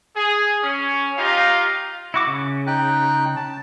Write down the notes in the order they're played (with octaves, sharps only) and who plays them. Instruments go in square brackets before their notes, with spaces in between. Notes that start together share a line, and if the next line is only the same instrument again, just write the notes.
[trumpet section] G#4
C#4
D#4 F4 G4 F5
[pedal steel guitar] E4 F#4 D6
C#3
[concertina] D#4 G5 F#6
A5